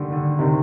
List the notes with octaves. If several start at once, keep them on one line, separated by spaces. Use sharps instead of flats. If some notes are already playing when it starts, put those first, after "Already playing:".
Already playing: D3 D#3 G3
D3
C3 D#3